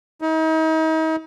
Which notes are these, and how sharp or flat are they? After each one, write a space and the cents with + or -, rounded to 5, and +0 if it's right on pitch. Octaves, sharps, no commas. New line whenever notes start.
D#4 +40